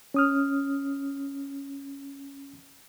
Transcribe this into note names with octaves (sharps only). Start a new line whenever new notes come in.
C#4 D#6 F6